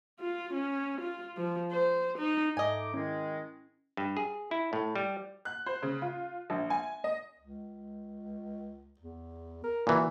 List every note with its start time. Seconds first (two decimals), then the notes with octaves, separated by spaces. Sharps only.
0.20 F4
0.54 C#4
1.01 F4
1.37 F3
1.72 C5
2.18 D#4
2.57 G#2 A3 D#4 D#5 G#5 D6
2.94 D#3 G#3 C#4 E4
3.97 G2
4.17 G#4
4.51 E4
4.73 A2
4.96 G3
5.45 F#6
5.66 C5
5.82 C#3
6.02 F4
6.50 A#1
6.70 G#5
7.04 D#5
7.39 C#2
8.99 E2
9.64 A#4
9.87 A#2 E3 F#4